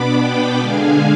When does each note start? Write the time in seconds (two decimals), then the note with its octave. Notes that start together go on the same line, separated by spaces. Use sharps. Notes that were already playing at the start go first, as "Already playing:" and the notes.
Already playing: B2 B3 D4 B5 D6
0.15 G5 B5
0.58 D3 G#3 D4 F5 G#5